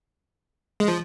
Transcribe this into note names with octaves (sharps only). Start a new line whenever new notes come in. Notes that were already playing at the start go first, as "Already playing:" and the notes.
G#3
F3